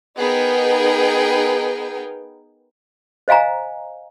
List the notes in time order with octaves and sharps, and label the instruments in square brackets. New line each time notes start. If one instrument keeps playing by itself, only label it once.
[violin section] B3 D#4 G#4 A#4 G5
[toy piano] C5 D#5 F5 G#5 A#5